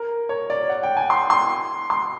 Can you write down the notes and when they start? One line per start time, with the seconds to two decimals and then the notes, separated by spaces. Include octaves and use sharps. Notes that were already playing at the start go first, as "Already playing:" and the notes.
Already playing: A#4
0.29 C#5
0.50 D5
0.70 F#5
0.83 G5
0.97 G#5
1.10 C6
1.30 C6
1.90 C6